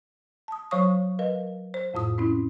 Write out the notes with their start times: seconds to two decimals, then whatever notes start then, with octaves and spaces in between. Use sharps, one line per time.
0.48 A5 D#6
0.71 F#3 C5 C#5 F5 C#6 D#6
1.19 A#4 B4 D#5 F5
1.74 C5
1.94 F2 A2 F4 D#6
2.18 C4 C#4 E4